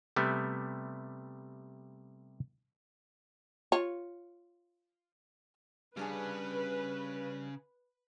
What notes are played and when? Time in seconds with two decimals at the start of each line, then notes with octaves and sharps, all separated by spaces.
0.16 C3 G3 A3 B3
3.72 F4 C#5
5.97 C#3 G3 C#4 D4 G#4 B4